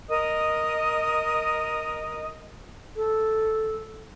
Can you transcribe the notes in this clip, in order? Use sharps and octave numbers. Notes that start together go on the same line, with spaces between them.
A#4 D#5 D#6
A4